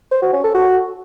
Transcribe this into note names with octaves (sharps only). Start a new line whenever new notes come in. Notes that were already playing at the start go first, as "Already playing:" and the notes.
C5
F#4
C#4
A4
F#4